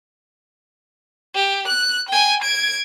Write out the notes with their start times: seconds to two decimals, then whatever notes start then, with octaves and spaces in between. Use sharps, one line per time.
1.35 G4
1.67 F#6
2.08 G5 G#5
2.42 G#6 D7